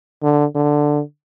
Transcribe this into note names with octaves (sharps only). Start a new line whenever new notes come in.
D3
D3